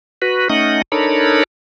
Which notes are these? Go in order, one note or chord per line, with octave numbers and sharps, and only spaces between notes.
F#4 B4
A3 C#4 D#4 D#5 F#5
D4 D#4 A4 A#4 C#5 B5